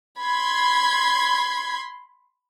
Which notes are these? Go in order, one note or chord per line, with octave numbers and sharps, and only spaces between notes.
B5 C6 G#6